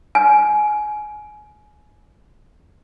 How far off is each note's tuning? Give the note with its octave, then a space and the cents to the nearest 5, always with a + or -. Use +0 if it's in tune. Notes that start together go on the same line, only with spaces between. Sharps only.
G#5 +25